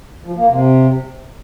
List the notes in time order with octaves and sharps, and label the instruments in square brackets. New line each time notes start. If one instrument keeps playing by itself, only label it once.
[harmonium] F3
A#3
C3